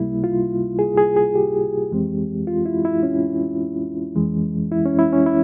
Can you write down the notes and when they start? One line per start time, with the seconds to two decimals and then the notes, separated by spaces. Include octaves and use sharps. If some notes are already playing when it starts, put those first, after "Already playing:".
Already playing: C#2 C3 G3 A#3 E4
0.24 F4
0.79 G#4
0.97 G#4
1.17 G#4
1.35 G4
1.91 F2 E3 G#3 C4
2.47 F4
2.66 E4
2.85 E4
3.03 C#4
4.16 F2 E3 G#3
4.72 E4
4.86 C#4
4.99 E4
5.13 C#4
5.26 E4